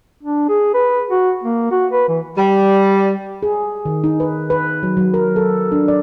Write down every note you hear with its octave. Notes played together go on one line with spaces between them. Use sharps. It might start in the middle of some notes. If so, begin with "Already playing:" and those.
D4
G#4
B4
F#4
A#3
F#4
B4
E3
G3
G#4
D#3
D#4
B4
B4
F#3
F#3
A#4
A4
D4
D5